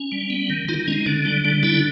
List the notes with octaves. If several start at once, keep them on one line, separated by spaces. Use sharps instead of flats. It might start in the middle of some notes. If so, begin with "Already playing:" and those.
Already playing: C#4
G3
B3
D#3
D#3 D#4 F4
G#3 C#4 D#4
D3 D4
G3 D4
G3 D4
D3 D4 E4